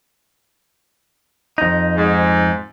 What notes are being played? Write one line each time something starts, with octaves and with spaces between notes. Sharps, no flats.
F2 D#4
G#2